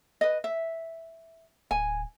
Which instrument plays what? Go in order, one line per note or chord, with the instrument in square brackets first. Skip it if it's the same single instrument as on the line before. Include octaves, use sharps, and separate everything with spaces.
[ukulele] B4 D#5
E5
[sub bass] D1 [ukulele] G#5